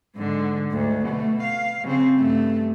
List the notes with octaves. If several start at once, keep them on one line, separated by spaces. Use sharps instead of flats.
G#2 D3
D2 G#2
B2 A3
F5
C#3 C4
G2 A3